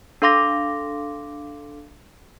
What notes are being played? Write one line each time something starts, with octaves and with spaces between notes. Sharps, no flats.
D4 A4 F5 C6 D6 A#6